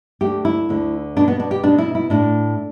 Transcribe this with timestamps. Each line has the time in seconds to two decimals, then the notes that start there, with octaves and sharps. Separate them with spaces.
0.21 D2 D3 A3 G4
0.45 E4
0.69 D2 D3 A3
1.16 B2 B3 D4
1.28 B3
1.40 D4
1.51 G4
1.63 B2 B3 D4
1.78 E4
1.95 E4
2.10 A2 A3 D4